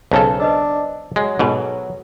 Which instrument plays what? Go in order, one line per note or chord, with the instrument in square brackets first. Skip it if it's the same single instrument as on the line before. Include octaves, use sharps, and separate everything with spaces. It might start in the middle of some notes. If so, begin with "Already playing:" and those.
[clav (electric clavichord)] B1 C#3 A4 [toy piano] C5 A5 A#5
[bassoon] D4 [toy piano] B4 D#5 E6
[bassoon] F#3 [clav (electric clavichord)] G#3
[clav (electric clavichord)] G#2 B2 [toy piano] A4 B4